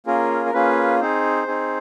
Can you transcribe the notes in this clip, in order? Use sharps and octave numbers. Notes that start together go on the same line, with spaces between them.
A#3 C#4 F4 G#4 A#4
A#4
A#3 C#4 F4 G#4 B4
C4 D#4 G#4 C5
C4 D#4 G#4